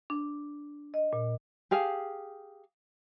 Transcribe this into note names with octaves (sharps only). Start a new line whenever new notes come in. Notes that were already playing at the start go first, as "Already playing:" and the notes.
D4
D#5
A#2
G4 G#4 F5